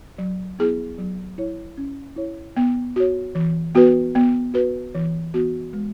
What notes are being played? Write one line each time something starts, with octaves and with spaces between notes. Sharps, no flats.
F#3
B3 E4 G#4
F#3
E4 C#5
C#4
E4 C#5
B3
F#4 C#5
E3
B3 F#4 B4
B3
F#4 B4
E3
B3 F#4
G#3